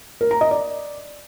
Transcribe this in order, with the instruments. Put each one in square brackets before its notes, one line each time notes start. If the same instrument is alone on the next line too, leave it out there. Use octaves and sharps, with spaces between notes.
[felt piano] A#4
A#5
D#5
D5